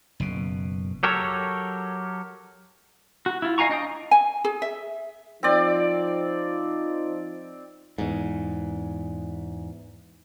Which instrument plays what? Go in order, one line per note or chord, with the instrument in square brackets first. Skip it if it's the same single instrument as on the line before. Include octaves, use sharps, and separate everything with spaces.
[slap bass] F#1 B2
[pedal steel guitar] F#3 G4 A4 A#4 C#5
F#4
E4 F4
D#5 F5 G#5 A#5 C#6
D4 D#5 G5 D#6
[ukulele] G#5
G#4
E5
[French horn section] F3 D#4 F4 [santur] C4 D5
[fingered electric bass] E2 G#2